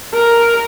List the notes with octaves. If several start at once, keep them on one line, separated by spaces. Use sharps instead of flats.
A#4